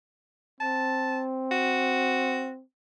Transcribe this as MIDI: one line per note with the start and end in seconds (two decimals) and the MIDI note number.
0.60 2.63 60
0.60 1.20 81
1.51 2.51 66